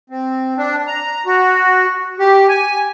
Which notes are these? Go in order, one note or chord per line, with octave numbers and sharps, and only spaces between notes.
C4
D4
A#5
F#4
G4
G#5